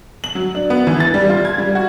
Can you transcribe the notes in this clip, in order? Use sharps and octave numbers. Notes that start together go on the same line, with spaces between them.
F#7
F#3
D4
B3
E3
A6
G3
F4
G#6
G3
F#4